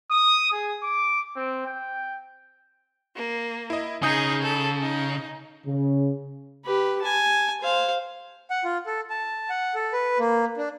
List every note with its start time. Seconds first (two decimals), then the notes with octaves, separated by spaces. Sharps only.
0.11 D#6
0.52 G#4
0.82 D6
1.36 C4
1.66 G5
3.16 A#3
3.70 E4 D#5
4.02 C#3 D#4 G#4 G#5 D#6 G6
4.43 A4
4.82 D#4
5.66 C#3
6.65 G4 B4
7.02 G#5 A5
7.61 C5 F5
8.51 F#5
8.64 F4
8.86 A4
9.10 A5
9.50 F#5
9.75 A4
9.93 B4
10.19 A#3
10.57 D4